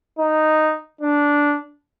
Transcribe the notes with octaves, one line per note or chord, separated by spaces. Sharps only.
D#4
D4